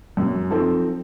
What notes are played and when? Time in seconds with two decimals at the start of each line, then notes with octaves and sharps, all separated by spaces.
0.17 F#2
0.50 F3 C4 D#4 A4